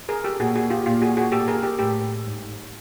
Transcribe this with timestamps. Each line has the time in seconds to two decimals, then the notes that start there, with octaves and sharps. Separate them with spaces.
0.09 G#4 A#4
0.24 G4 A4
0.40 A#2 F#4 G#4
0.55 F#4 G#4
0.70 F4 G4
0.86 A#2 F4 G4
1.02 F#4 G#4
1.17 F#4 G#4
1.32 A#2 G4 A4
1.48 G#4 A#4
1.63 G4 A4
1.78 A2 G4 A4
2.25 G#2